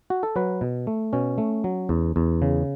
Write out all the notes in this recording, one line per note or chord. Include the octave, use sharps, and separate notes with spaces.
F#4
A4
F#3 B4
B2
A3
B2 C#4
A3
F#3
E2
E2
C#3